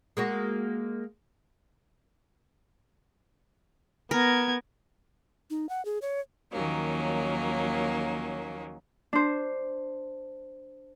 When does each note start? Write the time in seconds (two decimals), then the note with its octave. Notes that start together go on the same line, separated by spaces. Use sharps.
0.17 G#3 A#3 F#4
4.11 B3 A#4 G#6
5.50 D#4
5.69 F#5
5.85 G#4
6.02 C#5
6.51 D#2 D#3 F3 F#3 A#3 C#4
9.13 D4 C5